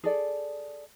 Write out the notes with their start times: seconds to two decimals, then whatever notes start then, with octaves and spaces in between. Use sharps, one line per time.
0.04 G#4 A4 D5